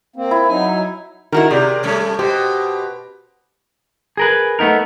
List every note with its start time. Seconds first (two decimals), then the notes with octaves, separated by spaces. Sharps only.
0.16 A#3 C4
0.31 E4
0.49 F#3 D#4 G#5
1.32 D#3 E4 F#4 A#4
1.51 C3 G4 G#4 A#4 D5 G6
1.83 G3 A3 C#4
2.19 B2 G4 C5
4.17 G#4 A#4 B4
4.59 A3 B3 D#4 A#4